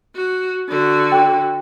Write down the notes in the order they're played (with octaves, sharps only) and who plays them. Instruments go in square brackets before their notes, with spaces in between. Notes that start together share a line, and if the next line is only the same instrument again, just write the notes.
[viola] F#4
D3 F#4
[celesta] G5